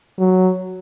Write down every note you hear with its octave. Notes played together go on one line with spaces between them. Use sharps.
F#3